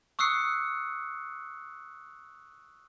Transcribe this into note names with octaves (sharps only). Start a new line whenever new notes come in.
C#6 D#6 E6 F#6 C7 C#7